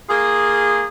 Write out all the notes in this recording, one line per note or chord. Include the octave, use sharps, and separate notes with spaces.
A#3 F4 G#4